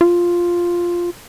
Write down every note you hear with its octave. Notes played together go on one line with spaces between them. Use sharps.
F4